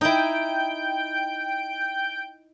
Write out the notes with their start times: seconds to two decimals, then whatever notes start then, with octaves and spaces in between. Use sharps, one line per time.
0.01 D#4 E4 G5 G6 D7